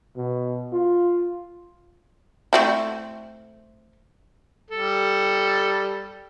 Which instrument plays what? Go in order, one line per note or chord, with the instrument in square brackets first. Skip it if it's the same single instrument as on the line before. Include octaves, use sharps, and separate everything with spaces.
[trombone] B2
F4
[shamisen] A3 C4 E4
[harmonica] G3 A4